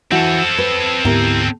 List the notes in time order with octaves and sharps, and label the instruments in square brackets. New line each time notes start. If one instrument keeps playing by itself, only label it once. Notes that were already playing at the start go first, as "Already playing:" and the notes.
[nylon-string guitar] E3 E4 F#4 [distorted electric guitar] C4 A4
[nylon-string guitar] B4
[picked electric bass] D2 G#2 B3 [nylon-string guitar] E4 G4 A#4